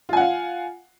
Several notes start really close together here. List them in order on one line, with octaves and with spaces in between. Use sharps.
F4 G#5 F#5 F5